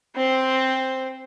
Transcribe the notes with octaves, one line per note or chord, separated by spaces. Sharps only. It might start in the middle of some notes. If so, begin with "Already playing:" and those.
C4 C5